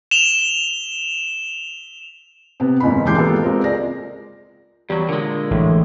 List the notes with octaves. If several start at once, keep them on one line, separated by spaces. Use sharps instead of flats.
E7 F7 G7
C3 B3
F#1 E2 G#2 C#3 B5
E1 D#2 E3 D6 G6 C7
G#3 A#3 B3 F4 G4 A4
G#3 C4 F4 A#4
C#2 G#3 D5 A#6
E2 F#3 G3
A#2 D3 G#3
A1 A2